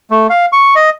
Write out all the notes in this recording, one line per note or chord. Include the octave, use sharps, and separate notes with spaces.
A3
F5
C#6
D#5